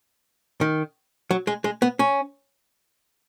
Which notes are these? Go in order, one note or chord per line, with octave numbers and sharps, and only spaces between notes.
D#3
F#3
G#3
G#3
B3
C#4